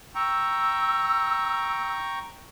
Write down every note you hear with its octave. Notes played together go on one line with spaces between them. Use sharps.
G5 A#5 C#6 E6